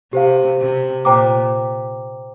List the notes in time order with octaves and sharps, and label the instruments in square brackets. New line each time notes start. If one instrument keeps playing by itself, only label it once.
[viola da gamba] C3 [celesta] G4 C5 F5
[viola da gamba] C3
[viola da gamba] A#2 [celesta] C5 G5 A#5 D6